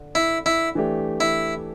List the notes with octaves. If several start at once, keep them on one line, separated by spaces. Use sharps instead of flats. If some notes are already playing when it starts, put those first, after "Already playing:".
Already playing: D3
E4
E4
E3 A3 D4 G4
E4